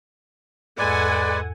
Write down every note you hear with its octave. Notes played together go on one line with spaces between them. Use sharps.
E2 G#2 G#3 A4 B4 D5 F#5 G#5